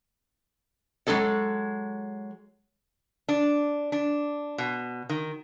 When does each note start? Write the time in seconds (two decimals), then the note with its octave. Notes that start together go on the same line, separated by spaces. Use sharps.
1.07 F#3 G#3 E4 G#4 A4 C#5
3.29 D4
3.92 D4
4.58 B2
5.09 D#3